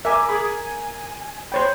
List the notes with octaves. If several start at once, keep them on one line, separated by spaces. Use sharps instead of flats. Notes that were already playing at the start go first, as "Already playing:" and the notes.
A#4 E5 G#5 D6
G#4 B5 D6
G#5
C5 C#5 G5 B5